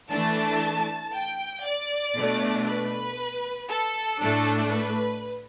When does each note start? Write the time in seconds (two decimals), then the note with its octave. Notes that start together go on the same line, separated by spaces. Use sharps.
0.10 E3 A3 D4 A5
1.13 G5
1.64 D5
2.15 B2 A3 D4
2.67 B4
3.70 A4
4.21 A2 A3 D4
4.72 B4